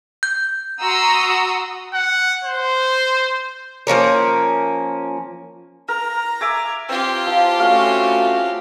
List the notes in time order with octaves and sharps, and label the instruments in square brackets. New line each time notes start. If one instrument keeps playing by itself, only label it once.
[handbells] G6
[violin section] F#4 A#5 C6 D#6 E6
[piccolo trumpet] F#5
C5
[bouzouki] F3 A#3 C#4 A#4
[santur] A#4 [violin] A#5
[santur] E5 G#5 D6
[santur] C4 [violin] F4 G4
[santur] F3
[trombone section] A3 C#4 F#4 [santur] F5